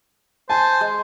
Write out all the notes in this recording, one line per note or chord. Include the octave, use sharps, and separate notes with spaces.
C5 G#5 A5
G#3